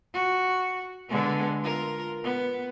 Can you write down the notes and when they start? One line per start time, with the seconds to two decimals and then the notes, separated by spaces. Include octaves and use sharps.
0.14 F#4
1.09 D3 G#3 B3
1.62 F4 A#4
2.23 B3